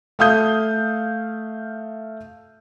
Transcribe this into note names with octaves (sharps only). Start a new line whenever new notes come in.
A3 F5 D#6 G6